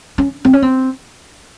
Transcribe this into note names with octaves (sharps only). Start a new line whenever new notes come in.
C#4
C4
C#4
C4